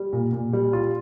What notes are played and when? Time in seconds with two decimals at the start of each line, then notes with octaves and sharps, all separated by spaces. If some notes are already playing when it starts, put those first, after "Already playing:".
Already playing: G3
0.13 A#2
0.33 A#2
0.53 G3
0.73 F4